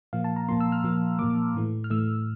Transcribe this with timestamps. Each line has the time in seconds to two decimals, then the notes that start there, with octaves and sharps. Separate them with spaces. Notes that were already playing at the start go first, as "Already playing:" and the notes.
0.13 A#2 F3 A#3 F5
0.24 A5
0.36 A#5
0.48 A#2 F3 A#3 C6
0.60 E6
0.72 F6
0.84 A#2 F3 A#3
1.19 A#2 F3 A#3 D6
1.55 A2 E3 A3
1.84 F6
1.90 A2 E3 A3 E6